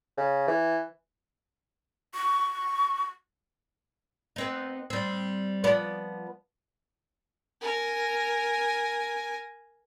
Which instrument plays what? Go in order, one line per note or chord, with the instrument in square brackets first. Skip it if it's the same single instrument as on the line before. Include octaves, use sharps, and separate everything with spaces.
[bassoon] C#3
E3
[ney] C#6
[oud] B3 C4 D#4
G3 C4
F3 B3 D5
[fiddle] A#4 G#5